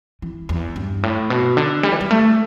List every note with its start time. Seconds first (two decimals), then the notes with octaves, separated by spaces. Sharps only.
0.22 E3
0.49 E2
0.76 G2
1.03 A2
1.30 B2
1.57 D3
1.83 G3
1.92 E3
2.01 G3
2.11 A3